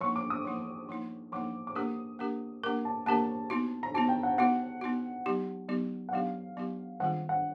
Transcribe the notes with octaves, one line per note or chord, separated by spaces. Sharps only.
F3 A#3 D#4 C#6
D6
D#6
F3 A#3 D#4
F3 A#3 D#4
F3 A#3 D#4 D6
D6
A#3 D4 G4 A#4 D#6
A#3 D4 G4 A#4
A#3 D4 G4 A#4 D6
A5
A#3 D4 G4 A#4 A5
B3 D#4 F#4
A#5
B3 D#4 F#4 A5
G5
F#5
B3 D#4 F#4 F#5
B3 D#4 F#4
F#3 B3 D#4 G4
F#3 B3 D#4 G4
F#5
F#3 B3 D#4 G4 F5
F#3 B3 D#4 G4
D#3 G3 C4 F4 G#4 F#5
F#5